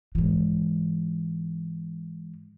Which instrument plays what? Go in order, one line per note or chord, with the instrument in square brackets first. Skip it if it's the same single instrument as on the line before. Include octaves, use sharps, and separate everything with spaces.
[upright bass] G#2 E3